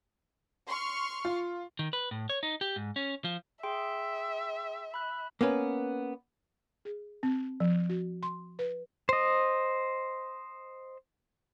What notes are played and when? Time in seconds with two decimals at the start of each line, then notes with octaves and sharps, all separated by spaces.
0.69 C6 C#6 F6
1.25 F4
1.79 D#3
1.93 B4
2.11 A2
2.29 C#5
2.43 D#4
2.61 G4
2.76 G#2
2.96 C#4
3.24 F3
3.63 G#4 E5 G5 C6
4.94 B5 F#6
5.41 A#3 B3 C#4 B4
6.85 G#4
7.23 C4
7.60 F3
7.89 F#4
8.23 C6
8.59 B4
9.09 C5 D#5